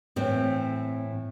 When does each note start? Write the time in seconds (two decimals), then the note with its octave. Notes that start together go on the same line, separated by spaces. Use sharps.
0.16 A2 E3 C4